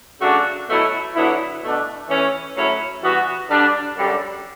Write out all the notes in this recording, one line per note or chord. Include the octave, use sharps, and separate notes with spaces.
C#3 F#3 A3 D4 F#4
B2 F#3 A3 E4
D3 F#3 B3 E4
B2 A3 D4
E3 A3 C#4
A2 F#3 C#4 E4
E3 G3 B3 F#4
D3 G3 D4
F#2 D3 G3